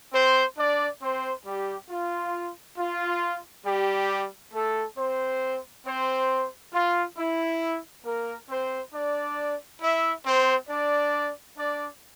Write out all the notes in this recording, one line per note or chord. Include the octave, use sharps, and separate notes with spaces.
C4 C5
D4 D5
C4 C5
G3 G4
F4
F4
G3 G4
A3 A4
C4 C5
C4 C5
F4
E4
A#3 A#4
C4 C5
D4 D5
E4 E5
C4 C5
D4 D5
D4 D5